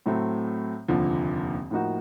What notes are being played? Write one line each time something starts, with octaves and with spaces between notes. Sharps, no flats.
A2 F#3 A3 C4
F1 D#2 D3 F3
A2 F3 A#3 D#4 F#4